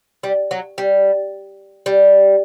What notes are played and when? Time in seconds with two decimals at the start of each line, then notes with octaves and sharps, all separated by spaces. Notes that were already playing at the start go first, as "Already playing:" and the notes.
0.23 G3
0.51 F#3
0.78 G3
1.86 G3